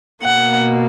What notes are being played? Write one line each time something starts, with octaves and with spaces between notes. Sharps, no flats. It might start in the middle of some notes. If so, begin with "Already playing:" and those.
B2 A#3 F#5